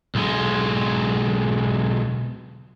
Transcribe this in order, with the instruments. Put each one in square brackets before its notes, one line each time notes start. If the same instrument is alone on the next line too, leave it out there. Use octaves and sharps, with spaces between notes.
[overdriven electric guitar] B1 G#3